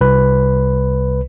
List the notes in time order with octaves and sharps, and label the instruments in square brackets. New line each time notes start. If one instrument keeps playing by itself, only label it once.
[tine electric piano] C2 B4